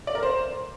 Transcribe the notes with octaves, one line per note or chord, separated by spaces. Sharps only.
D5
A#4
C5